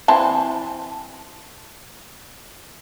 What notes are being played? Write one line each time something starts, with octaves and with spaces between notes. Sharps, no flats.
E3 C4 A5